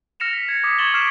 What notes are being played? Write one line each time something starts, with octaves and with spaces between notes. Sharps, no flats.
F6 A#6 C#7 E7 F7
B6
G#6 C#7
D6 D#6 B6
C#6 G#6 A6 E7 F#7 G7
D6 F6 C7 D7 E7